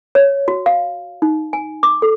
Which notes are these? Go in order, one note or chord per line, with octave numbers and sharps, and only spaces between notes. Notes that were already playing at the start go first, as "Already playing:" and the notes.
C#5
F#4
F5
D#4
G#5
D6
A4